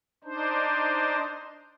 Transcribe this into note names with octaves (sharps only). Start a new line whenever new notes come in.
D4 D#4 C5